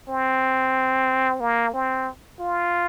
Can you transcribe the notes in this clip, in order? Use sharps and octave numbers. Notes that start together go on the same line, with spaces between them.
C4
A#3
C4
F4